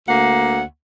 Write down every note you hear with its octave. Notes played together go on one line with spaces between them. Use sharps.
D2 A#3 F#5